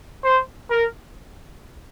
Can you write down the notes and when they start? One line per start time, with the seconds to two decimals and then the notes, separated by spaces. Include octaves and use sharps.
0.24 C5
0.71 A#4